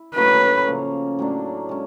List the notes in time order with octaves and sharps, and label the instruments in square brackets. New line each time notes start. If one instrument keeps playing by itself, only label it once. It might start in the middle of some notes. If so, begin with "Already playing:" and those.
Already playing: [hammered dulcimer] E4
[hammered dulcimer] A2 F#3 A#3 C#4 [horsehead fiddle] B4
[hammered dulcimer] C#3 F3 A#3 C#4
A2 F#3 A#3 D4
G#3 C#4